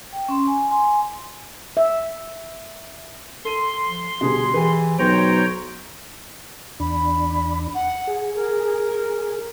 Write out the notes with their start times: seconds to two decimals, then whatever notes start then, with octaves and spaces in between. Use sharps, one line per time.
0.13 G5
0.29 C#4 C6
0.47 G#5
0.71 G#5 C6
1.77 E5
3.45 A4 C6 D#7
3.86 F3
4.21 B2 D3 G3 G#4
4.54 E3 G4 G#4 B4
4.99 B1 C5 C#5 G5 A#5
6.80 E2 D4 B5
7.74 F#5
8.07 G#4
8.34 A#4